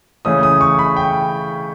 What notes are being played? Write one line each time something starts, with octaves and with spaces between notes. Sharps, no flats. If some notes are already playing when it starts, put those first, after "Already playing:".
C#3 E3 A3 C#4 D#6
D#6
C#6
B5
G5